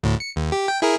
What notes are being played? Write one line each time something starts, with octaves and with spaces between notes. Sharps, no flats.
D2 A2
C#7
D#2
G4
G5
E4 G#4 A#4